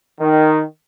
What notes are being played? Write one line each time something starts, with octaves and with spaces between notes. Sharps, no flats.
D#3